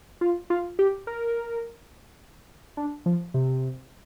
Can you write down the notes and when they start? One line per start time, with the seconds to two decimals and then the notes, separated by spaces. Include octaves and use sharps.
0.21 F4
0.50 F4
0.79 G4
1.07 A#4
2.77 D4
3.06 F3
3.34 C3